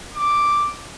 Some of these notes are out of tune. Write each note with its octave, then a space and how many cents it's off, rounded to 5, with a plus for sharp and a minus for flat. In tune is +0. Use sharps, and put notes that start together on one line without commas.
D6 +0